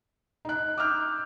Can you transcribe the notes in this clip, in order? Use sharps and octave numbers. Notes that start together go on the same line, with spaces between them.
D#4 F#6
D6 E6 F6 G6